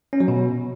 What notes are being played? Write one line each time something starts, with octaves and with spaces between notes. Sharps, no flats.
C#4
F#3
B2